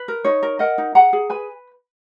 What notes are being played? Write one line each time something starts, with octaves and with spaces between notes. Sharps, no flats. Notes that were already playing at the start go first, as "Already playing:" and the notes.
Already playing: B4
A#4
D#4 C#5
A#4
A#4 D#5 F#5
D#4
G#4 F#5 A#5
G#4
B4 G#5 B5